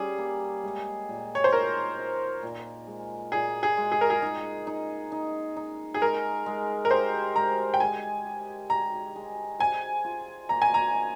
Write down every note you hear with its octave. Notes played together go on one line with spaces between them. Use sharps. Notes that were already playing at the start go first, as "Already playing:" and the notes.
Already playing: G3 C#4 G#4
A#3
G#3
A#2
C#5
C5
D#4 A#4
D#4
A#2
G#3
A#2 G#4
G#4
G#3
G#4
A#4
G#4
D#4
D#4
D#4
D#4
G#4
G#3 A#4
G#3
A#4
G4 C5
G#3 A#5
G5
G#3 G#5
G4
G4 A#5
G#3
C5 G#5
F4
A#3 A#5
G#5
A#5
D#5